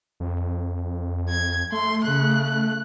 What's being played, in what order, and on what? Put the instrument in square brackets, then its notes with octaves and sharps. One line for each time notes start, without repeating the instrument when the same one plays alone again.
[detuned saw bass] F2
[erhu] G#6
[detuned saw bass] A3 [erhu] C6
[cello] C#3 [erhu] F#6